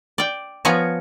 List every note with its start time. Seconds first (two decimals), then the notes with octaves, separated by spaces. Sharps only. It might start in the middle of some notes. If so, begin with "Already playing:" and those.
0.18 D5 G5
0.65 F3 B3 C#5 G#5 A#5